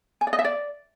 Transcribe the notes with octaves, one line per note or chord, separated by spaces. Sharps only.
G#5
D5
D#5
E5
D5